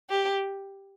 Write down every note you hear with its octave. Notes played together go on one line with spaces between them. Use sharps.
G4